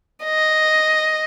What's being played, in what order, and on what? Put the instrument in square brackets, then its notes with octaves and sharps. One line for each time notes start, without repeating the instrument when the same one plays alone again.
[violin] D#5